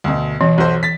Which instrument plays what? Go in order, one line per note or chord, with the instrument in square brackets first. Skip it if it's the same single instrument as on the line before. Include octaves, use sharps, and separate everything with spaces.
[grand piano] D2 B2
[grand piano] B2 [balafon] E3
[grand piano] B1 F#4 C5
A6 B6